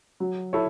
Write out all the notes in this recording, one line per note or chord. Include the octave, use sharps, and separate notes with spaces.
F#3
E4 A4 C#5